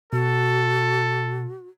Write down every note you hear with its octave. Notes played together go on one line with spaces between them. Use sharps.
B2 F#4 A4